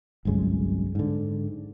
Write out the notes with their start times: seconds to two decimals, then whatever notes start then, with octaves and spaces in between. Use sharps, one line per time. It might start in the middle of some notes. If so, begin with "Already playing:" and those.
0.25 G1 C2 F#2 G#3
0.95 G#2 D3